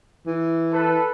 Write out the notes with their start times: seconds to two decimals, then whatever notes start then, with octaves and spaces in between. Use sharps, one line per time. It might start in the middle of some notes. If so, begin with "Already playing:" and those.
0.27 E3
0.73 A4 B4